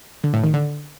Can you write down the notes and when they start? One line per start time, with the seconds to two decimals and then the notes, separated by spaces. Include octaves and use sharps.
0.24 D3
0.34 A2
0.44 D#3
0.54 D3